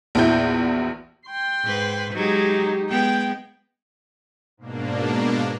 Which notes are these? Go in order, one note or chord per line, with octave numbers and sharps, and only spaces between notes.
A#1 E2 E4 F#4 E5 G6
G5 C6
G#2 B4
F#3 G#3 D#4 G4
G#3 B3 G5
G#2 B2 A#3 D4